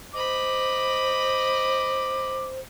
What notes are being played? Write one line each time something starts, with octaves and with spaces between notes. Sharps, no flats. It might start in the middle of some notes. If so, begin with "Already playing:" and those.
C5 D#5 B5 D6